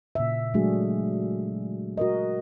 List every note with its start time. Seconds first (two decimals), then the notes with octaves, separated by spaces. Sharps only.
0.15 A#2 C#3 E5
0.54 F#3 G#3 A3 D4 F#4 G#4
1.98 F#4 A#4 D#5